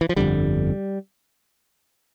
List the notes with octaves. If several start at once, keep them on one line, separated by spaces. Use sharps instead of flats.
E3
F3
G1 F2 D3 G3